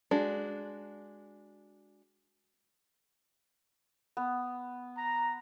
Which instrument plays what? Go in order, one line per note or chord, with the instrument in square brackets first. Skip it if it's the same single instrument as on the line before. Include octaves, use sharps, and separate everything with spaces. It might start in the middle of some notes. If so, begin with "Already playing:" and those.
[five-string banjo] G#3 D4 F#4
[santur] B3
[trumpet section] A#5